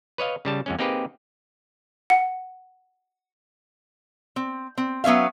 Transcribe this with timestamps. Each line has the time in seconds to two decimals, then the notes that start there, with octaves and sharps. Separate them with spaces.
0.18 B4 C#5 D#5 F5
0.45 C#3 G3 A5
0.66 F2 G#3 C#4
0.79 A#3 C4 D#4 G4 G#4 B4
2.10 F#5
4.36 C4
4.77 C4
5.04 F#3 B3 C#4 E5 F5